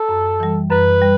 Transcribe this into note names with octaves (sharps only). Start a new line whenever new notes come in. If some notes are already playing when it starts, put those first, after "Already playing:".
Already playing: A4
F#2
E3 G3
F#2 B4
G3